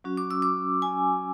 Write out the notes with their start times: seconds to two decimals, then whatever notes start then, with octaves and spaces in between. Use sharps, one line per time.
0.04 F#3 C#4 F#4
0.17 D6
0.31 E6
0.42 D6
0.82 G#5